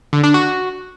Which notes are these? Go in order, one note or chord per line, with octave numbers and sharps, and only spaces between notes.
D3
D4
F#4